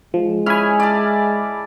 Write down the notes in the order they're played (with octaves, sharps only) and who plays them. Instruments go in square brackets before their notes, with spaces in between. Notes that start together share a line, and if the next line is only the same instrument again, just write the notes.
[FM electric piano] F3 [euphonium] G#3
[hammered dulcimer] C#4 E4 G#4 [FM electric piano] G#5 B5 F6
[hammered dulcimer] D5 A5